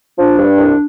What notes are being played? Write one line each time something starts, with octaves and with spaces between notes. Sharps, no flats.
F3 D4
G2
C2